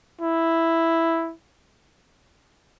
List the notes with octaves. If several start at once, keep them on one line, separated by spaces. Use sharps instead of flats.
E4